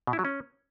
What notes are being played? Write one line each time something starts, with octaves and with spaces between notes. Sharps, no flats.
B2
E4
F#3
C#4